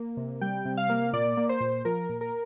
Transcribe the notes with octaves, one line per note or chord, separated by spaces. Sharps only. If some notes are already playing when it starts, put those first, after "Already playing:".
Already playing: A#3
C3
G3 G5
C3
F5
A#3
A#2 D5
A#3
C5
A#2
F3 A#4
A#2
A#4